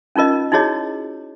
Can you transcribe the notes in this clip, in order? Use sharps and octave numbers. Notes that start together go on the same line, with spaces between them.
C#4 D#4 F4 A#4 D#5
D#4 E4 F#4 G#4 C#5 D#5